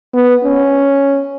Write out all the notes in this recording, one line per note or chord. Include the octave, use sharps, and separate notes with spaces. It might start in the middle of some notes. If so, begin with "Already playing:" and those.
B3
C#4